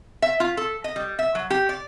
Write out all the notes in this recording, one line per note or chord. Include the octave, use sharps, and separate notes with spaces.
E5
F4
A4
D#5
G3
E5
F#3
G4
D5